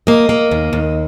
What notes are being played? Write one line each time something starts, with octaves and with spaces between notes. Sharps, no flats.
A#3 D#5
A#3
D#2
D#2